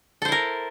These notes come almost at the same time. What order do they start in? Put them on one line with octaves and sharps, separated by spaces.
A4 C5 E4 A#4